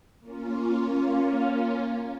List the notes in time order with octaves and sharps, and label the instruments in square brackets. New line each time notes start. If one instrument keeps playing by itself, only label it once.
[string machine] A#3 C#4 F4